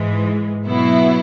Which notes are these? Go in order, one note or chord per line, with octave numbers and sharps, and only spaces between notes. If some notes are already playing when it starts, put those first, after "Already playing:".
Already playing: G#2 E3 G#3
B2 F#3 B3 E4